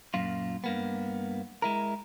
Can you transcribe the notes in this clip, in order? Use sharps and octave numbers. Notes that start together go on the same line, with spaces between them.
F#2 A#2 F4
G2 A#3 B3
G#3 E4 A#4